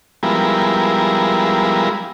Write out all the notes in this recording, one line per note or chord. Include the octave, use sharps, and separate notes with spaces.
F3 G3 G#3 B3 E4 A#4